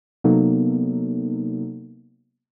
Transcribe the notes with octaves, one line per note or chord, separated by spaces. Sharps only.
C3 F#3 A#3 B3 D#4 A4